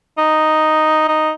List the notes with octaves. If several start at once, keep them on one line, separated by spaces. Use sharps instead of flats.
D#4
D#4